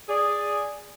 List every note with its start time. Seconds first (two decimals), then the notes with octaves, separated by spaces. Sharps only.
0.09 G#4 D5